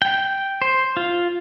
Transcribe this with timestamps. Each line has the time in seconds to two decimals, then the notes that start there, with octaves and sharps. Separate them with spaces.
0.02 G5
0.62 C5
0.97 F4